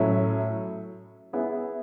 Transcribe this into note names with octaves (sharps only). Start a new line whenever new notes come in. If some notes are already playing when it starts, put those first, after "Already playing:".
Already playing: A2 F#3 C#4 E4 A4
B3 E4 G#4